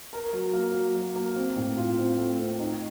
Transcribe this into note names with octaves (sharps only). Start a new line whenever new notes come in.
A#4
F#3
A#3
F#3
F#3
A#3
C4
A2
F4
C4
A3
C4
D#4